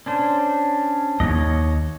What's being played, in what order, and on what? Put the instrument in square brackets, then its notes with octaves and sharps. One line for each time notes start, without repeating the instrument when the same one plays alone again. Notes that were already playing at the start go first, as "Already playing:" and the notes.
[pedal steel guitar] C#4 D4 C5
[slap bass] D#2 [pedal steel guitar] C#5 D#5